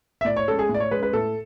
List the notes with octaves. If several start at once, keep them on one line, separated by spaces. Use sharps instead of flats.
E5
A2 D5
C#5
G#3 C#4 A4
G#4
A2
D5
C#5
G#3 B4
C#4
B4
A2 A4